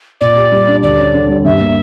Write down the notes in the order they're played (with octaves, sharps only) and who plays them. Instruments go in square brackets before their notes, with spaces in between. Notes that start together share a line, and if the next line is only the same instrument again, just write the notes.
[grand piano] A#2 [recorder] D5
[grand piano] G4
G3
D4
[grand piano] D2 [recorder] D5
[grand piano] C#4
D3
G3
[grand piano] G2 [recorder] E5
[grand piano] A#3